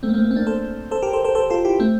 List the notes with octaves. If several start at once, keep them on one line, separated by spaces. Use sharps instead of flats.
A3 C4
A#3
A3 C4
A#3
C4
A#3 D4
A4 C5
A4 C5
G4 A#4
A4 C5
A4 C5
A4 C5
F4 A4
E4 G4
A3 C4